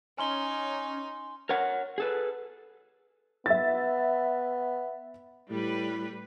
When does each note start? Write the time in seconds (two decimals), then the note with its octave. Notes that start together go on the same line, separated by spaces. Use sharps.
0.18 C#4 D#4 G#5 C6 G7
1.49 A#4 C#5 F#5
1.98 G#4 A4 B4
3.46 B3 E5 A6
5.51 A2 G3 B4